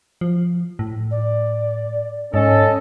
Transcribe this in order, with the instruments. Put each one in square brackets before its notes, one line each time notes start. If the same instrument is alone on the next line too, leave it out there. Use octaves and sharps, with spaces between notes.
[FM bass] F3
A2
[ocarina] D5
[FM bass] G#2 [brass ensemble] C#4 A4 [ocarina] D#5